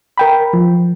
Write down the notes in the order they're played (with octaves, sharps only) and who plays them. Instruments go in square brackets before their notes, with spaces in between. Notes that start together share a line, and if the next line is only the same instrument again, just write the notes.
[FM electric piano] A#4 G5 B5
F3